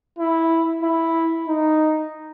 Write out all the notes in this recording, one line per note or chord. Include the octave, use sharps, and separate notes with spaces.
E4
E4
D#4